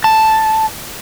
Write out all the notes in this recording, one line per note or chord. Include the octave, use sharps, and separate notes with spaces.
A5